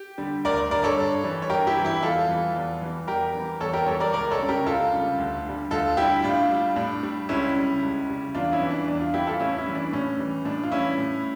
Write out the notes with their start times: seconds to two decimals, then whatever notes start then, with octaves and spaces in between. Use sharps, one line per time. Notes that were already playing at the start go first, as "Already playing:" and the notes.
Already playing: G4
0.18 D3 G3
0.45 D2 A#4 D5
0.70 D3 G3 A#4 D5
0.84 A4 C#5
0.98 G2
1.24 E3 G3
1.42 C#5
1.49 G2 G4 A#4
1.67 E4 G4
1.77 E3 G3
1.85 E4 G4
2.03 E2 F4 A4
2.29 E3 G3
2.55 E2
2.82 E3 G3
3.07 E2 G4 A#4
3.35 E3 G3
3.60 E2 A4 C#5
3.73 G4 A#4
3.86 E3 G3 A4 C#5
4.00 A#4 D5
4.13 C#2 A#4 D5
4.31 A4 C#5
4.39 C#3 G3
4.49 G4 A#4
4.66 C#2 F4 A4
4.93 C#3 G3
5.18 D2
5.45 D3 G3
5.71 D2 F4 A4
5.97 D3 G3 E4 G4
6.24 A2 D4 F4
6.51 G3
6.76 A2 D4
7.03 G3
7.29 C#2 C#4 E4
7.56 C#3 G3
7.82 C#2
8.09 C#3 G3
8.35 E2 D4 F4
8.52 C#4 E4
8.62 E3 G3
8.70 D4
8.88 E2 D4
9.00 D4 F4
9.14 E3 G3 E4 G4
9.27 F4 A4
9.39 A2 C#4 E4
9.57 C#4 E4
9.66 E3 G3
9.75 D4
9.93 A2 C#4
10.19 E3 G3
10.45 A2 D4
10.63 F4
10.71 E3 G3 C#4 E4
10.98 A2